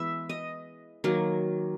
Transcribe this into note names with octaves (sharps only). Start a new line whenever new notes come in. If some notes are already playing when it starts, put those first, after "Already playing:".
Already playing: E3 G#3 B3 E5
D#5
D#3 F#3 A#3